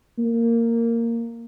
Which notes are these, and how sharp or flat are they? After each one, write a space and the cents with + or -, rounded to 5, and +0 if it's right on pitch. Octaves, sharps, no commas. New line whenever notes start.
A#3 -10